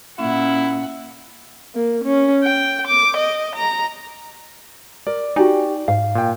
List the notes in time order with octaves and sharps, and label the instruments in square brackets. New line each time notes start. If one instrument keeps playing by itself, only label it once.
[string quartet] A#2 [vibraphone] C#4 [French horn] E4 [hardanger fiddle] F#5
[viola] A#3
C#4
G5
D6
D#5
A#5
[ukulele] A#4 [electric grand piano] D5
[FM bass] D#4 [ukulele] F#4 G4 G#5 [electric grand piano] D5
[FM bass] G#2 [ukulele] F5
[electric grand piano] A#2 G5